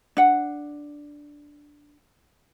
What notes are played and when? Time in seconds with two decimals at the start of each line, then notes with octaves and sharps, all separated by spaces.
0.17 D4 F#5